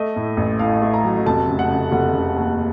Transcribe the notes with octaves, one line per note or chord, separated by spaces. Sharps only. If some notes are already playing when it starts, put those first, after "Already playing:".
Already playing: A3 D#5
A2
A1
A2 F5
A3
A#5
F#3
F1 A5
C#3
F#5
C#3
F1 F#5
C#3
D#2